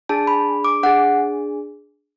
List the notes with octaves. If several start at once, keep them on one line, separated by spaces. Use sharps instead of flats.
D4 G#4 A5
B5
D6
D4 G#4 F#5